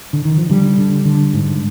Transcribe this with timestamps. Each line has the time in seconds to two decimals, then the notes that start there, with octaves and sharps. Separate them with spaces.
0.13 D3
0.25 D#3
0.38 F3
0.49 D3 G3
0.78 D3
1.05 D3
1.34 G#2